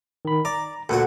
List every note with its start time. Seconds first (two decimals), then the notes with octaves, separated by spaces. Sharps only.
0.25 D#3 B5
0.45 D5 A#5
0.89 D2 A#2 F#4 A4 F#5